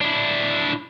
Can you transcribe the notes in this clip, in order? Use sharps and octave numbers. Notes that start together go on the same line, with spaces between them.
D4 E4